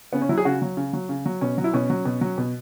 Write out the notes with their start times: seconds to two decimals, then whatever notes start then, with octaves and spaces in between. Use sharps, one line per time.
0.13 C#3 B3
0.22 C#4
0.29 F#3 E4
0.38 G#4
0.45 C#3 F#4
0.62 F#3
0.77 C#3
0.93 F#3
1.09 C#3
1.26 F#3
1.41 B2 C#4
1.58 F#3
1.64 E4
1.74 B2 C#4
1.90 F#3
2.05 B2
2.21 F#3
2.38 B2